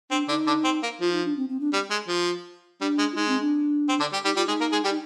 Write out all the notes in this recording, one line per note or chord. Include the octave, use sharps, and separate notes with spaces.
C4 D4
D3 D4 D#4
D3 D4
C4
A#3
F3 F4
D#4
D4
C4
C4
D4
G3
G#3
F3
G3 D4
G#3
F4
G#3 D#4
C4
D4
C4
D3 D4
G3 G4
G3 D#4 G4
G3 F4 G4
G#3 D#4 G#4
A#3 A#4
G#3 G#4
G3 G4
D#4